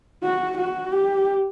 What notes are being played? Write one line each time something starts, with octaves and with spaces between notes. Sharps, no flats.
F#4
F#4
G4